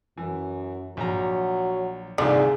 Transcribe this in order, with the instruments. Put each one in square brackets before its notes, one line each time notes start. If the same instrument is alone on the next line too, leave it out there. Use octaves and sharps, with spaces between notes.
[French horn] F#2 [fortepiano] E3
[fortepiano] A#1 A#5 [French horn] F#3
[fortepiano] C2 A#2 D#3 [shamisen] D3 [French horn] G#4